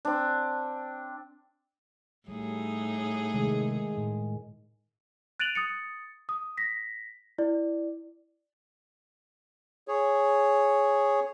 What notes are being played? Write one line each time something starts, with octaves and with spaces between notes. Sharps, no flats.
C4 D4
A2 G3 D#4 G#4
C3 D#3 G#3
A2
F#6 A6 D7 D#7 F7 F#7
D#6 A6 C#7
D#6
A#6 B6
E4 D5
G#4 C#5